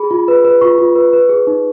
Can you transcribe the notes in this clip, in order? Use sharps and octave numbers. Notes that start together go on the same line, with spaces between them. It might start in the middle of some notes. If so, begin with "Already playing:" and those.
Already playing: G#4 B5
F4
B4
B4
F4 C#6
F4
B4
B4
G#4
D#4